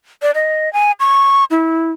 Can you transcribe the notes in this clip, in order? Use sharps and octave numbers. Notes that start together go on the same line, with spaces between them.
D5
D#5
G#5
C#6
E4